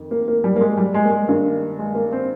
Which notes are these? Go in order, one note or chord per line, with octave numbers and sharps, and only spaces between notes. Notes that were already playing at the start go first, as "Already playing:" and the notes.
Already playing: F2 D#3
A#3
A#3
G3
A#3
G#3
G3
G#3
A#3
G#3
G2 D#3 A#3
G#3
A#3
C4